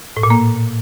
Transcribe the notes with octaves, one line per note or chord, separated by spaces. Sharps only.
A2
A#2
A#3